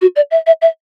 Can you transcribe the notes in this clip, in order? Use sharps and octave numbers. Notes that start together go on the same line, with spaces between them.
F#4
D5
E5
E5
E5